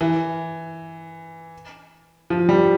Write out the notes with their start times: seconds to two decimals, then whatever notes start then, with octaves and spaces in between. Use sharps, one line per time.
0.01 E3
2.30 F3
2.49 G3